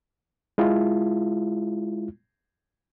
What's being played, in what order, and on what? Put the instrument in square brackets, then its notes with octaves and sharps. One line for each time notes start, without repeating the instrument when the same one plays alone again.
[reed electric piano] G#3 E4 F4